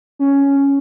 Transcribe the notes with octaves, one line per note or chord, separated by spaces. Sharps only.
C#4